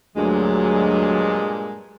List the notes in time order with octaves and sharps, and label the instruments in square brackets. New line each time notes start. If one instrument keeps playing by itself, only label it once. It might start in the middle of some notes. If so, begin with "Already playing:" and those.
[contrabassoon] D2 [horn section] G2 A#2 G#3 [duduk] F#3